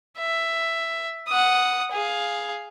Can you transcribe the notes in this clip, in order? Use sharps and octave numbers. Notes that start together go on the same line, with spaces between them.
E5
F#5 D#6
G#4 F5